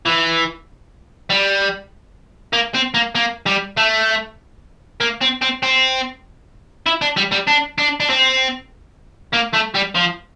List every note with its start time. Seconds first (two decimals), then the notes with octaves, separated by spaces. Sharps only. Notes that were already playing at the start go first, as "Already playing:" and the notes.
0.06 E3
1.30 G3
2.53 A#3
2.75 C4
2.94 A#3
3.15 A#3
3.46 G3
3.77 A3
5.01 A#3
5.21 C4
5.42 C4
5.63 C4
6.86 E4
7.01 D4
7.17 G3
7.32 G3
7.48 D4
7.78 D4
8.00 D4
8.09 C4
9.33 A#3
9.53 A3
9.74 G3
9.95 F3